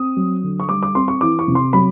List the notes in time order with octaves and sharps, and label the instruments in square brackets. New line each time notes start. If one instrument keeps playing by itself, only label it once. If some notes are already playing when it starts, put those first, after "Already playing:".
Already playing: [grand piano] C4 D#6
F#3
D3
C#6
G3 D6
D6
C4 C6
C#6
E3 D6
C#6
C3
C6
F#3 B5